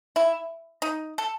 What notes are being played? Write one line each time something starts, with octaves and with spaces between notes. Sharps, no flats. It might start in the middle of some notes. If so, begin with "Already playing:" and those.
E4
D#4
A4